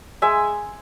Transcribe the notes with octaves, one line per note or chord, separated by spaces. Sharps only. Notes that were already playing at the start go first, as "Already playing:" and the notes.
G#3 E5 G#5